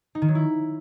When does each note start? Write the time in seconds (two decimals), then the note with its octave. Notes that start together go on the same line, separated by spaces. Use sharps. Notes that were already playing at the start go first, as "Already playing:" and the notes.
0.15 D#4
0.22 D#3
0.28 F#3
0.35 E4